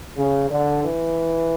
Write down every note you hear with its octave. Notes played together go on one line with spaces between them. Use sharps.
C#3
D3
E3